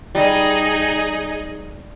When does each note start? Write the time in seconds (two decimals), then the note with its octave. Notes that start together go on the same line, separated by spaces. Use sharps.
0.15 G3 D#4 G#4